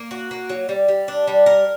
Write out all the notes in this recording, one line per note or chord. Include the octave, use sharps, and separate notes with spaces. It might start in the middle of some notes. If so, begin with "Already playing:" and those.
Already playing: A#3
F#4
A#3
F#3
G3
G3
D4
G3
A#4